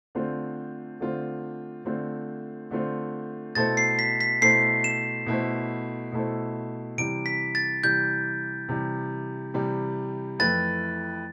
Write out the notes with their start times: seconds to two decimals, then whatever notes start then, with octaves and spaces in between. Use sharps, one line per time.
0.15 D3 A3 C4 F4 C5
1.00 D3 A3 C4 F4 C5
1.85 D3 A3 C4 F4 C5
2.71 D3 A3 C4 F4 C5
3.55 B2 A3 E4 A4 C5 A6
3.77 C7
3.99 B6
4.21 B6
4.41 B2 A3 E4 A4 C5 C7
4.84 E7
5.26 B2 A3 E4 A4 C5
6.12 B2 A3 E4 A4 C5
6.98 C3 E3 G3 D7
7.26 B6
7.55 A6
7.83 C3 E3 G3 G6
8.69 C3 E3 G3
9.54 C3 E3 G3
10.39 F2 E3 A3 E4 B4 A6